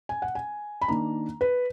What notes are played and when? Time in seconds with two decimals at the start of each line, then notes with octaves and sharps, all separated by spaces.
0.09 G#5
0.22 F#5
0.35 G#5
0.81 B5
0.88 D#3 A#3 D4 A#5
1.41 B4